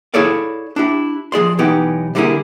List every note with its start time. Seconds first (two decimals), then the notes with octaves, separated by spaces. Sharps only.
0.14 E4 G#4 A4 C#5 D5 F5
0.76 D4 E4 G4
1.32 F3 G#4 D5 C6
1.59 B1 E3 B3 D#4 G4
2.15 D3 G3 A#3 C4 E4 G#4